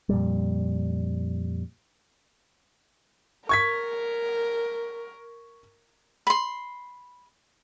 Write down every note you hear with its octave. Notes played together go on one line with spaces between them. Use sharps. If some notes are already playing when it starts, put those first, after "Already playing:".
F2 A#2 G3
A#4 C#6 G#6 B6
B5 C6